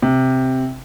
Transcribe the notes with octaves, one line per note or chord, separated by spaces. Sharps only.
C3